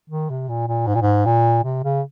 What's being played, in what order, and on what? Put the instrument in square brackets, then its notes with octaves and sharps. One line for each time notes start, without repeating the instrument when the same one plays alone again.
[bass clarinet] D#3
C3
A#2
A#2
G#2
A#2
G#2
A#2
C3
C#3